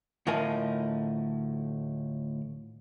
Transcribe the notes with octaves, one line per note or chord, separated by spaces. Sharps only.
D2 A2 F3 D#4 A#4 G#5